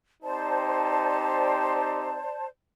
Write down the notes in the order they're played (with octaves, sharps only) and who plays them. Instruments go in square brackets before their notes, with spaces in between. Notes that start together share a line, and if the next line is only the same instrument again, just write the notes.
[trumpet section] C4 D#4 G4 [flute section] C5 D5 A5